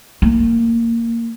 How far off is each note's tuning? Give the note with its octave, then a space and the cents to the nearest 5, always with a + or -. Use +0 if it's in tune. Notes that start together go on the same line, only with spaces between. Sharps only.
A#3 -15